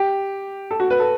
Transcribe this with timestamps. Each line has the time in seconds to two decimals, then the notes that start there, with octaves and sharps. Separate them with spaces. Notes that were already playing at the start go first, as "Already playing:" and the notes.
Already playing: G4
0.71 A4
0.80 F#4
0.90 B4
1.00 A4